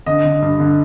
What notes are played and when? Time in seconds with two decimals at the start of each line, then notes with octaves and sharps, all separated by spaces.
0.06 D3 D#5
0.25 D3
0.42 G2
0.60 D3